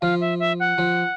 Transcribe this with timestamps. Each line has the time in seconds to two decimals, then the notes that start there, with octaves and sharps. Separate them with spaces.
0.01 F3 F5
0.21 E5
0.40 E5
0.60 F#5
0.78 F3